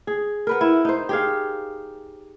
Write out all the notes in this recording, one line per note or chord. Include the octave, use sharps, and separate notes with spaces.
G#4
A#4 B4 F#5
E4
D#4 C5
G4 G#4 F5